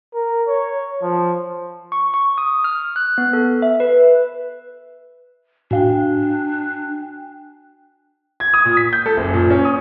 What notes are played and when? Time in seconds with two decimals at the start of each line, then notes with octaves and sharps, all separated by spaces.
0.14 A#4
0.48 C#5
1.03 F3
1.92 C#6
2.14 C#6
2.38 D#6
2.64 F6
2.96 F#6
3.18 B3
3.33 A4
3.62 E5
3.80 B4
5.71 A2 D4 F#4 F5 G5 G#5
8.40 G#6
8.54 D#6
8.65 A#2
8.77 B6
8.93 G6
9.06 A4
9.17 F#1
9.33 A#2
9.50 C#4
9.65 D#6